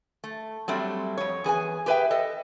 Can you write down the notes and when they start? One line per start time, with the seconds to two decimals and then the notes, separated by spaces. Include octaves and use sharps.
0.24 A3
0.68 F#3 G3 A3 C4
1.17 F2 C#5
1.44 E2 G#4 B4 G#5
1.86 G4 G#4 B4 C5 E5 G5
2.11 A4 D#5